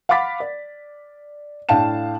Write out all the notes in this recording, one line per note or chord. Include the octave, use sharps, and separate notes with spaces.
F5 F#5 B5 D6 A6 B6
D5
A2 D4 F5 G5 A5 E7